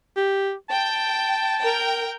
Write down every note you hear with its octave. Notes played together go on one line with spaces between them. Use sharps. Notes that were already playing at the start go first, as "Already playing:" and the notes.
G4
G5 A5
A#4 G5